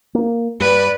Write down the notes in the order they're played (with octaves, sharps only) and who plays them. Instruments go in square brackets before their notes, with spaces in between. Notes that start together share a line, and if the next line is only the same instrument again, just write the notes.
[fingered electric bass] A#3
[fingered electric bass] G2 [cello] B4 D5